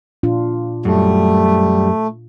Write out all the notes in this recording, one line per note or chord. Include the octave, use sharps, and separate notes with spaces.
A#2 D4 F4
F#2 G3 A3